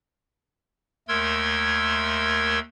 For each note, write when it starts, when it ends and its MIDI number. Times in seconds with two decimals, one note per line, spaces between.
1.08 2.59 39
1.08 2.59 57
1.08 2.59 70
1.08 2.59 84
1.08 2.59 88
1.08 2.59 92